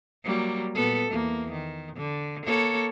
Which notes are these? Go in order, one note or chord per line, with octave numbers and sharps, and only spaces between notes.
F#3 G3 A#3
A#2 B3 A4
E2 A#3
D#3
D3
A#3 A4 C#5